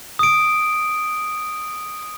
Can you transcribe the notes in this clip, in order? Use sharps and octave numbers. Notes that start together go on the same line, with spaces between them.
D#6 D7